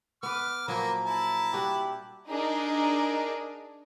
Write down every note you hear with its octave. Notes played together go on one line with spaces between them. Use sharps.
B3 B4 D6 F6
A#2 F3 F#3 A#3 B4 A#5
E4 A5 B5
G3 D4 F#4 G4
D4 D#4 G#4 A#4